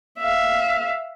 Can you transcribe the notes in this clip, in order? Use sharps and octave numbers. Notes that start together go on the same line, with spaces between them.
E5 F5